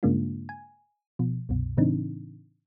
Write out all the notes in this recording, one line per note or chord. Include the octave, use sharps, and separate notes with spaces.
G2 C#3 G#3 A#3 D4 F4
G#5
B2 F3
C2 F#2 B2
A2 C#3 E3 C4 D4 D#4